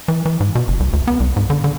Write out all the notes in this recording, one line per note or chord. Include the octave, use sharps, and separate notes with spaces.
E3
E3
G#2
B2
F#1
C2
D2
B3
C2
G#2
D3
D3